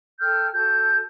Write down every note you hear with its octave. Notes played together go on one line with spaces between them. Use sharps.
A4 G5 F6 G6
F#4 A4 G6